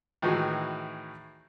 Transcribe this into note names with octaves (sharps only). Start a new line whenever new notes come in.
A2 D#3 E3 E4 F#4 G#4